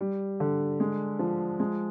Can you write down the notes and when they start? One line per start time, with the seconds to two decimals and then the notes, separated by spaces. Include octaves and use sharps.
0.01 G3
0.40 D3
0.80 G#3
1.19 F3
1.60 G#3